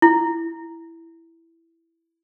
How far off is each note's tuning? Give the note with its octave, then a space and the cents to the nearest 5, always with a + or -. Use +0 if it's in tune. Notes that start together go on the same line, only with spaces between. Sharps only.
E4 +5